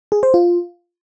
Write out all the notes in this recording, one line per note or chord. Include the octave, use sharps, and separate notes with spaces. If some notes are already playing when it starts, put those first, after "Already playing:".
G#4
C5
F4